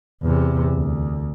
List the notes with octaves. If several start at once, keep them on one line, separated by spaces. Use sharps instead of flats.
E2 C3
D2